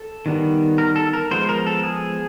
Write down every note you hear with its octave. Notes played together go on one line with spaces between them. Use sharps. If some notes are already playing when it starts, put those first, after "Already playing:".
Already playing: A4
D#3 G3 B3
A#4
A4
A#4
F3 G#3 B3 C5
A#4
A4
G#4